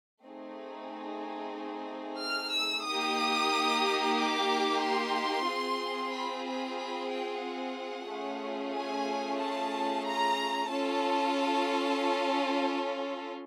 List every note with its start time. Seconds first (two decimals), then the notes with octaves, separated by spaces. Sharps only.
0.25 A3 C4 D#4 G#4
2.21 F6
2.53 E6
2.86 A#3 D#4 G4 D#6
4.17 D6
4.82 C6
5.48 C4 F4 G#4
6.13 B5
6.46 B5
6.78 B5
7.10 G5
7.44 F#5
8.09 A3 C#4 F4 G#4
8.75 G#5
9.39 A5
10.05 A#5
10.70 C#4 F4 A4 A5